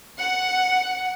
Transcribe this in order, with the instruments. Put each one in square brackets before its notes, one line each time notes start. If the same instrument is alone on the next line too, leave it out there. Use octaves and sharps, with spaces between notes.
[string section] F#5